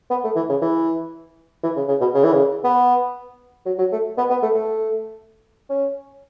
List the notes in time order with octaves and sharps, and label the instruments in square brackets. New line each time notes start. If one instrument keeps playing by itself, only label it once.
[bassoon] B3
A3
E3
C#3
E3
E3
C#3
C#3
B2
C#3
E3
C#3
B3
F#3
F#3
A3
B3
B3
A3
A3
C#4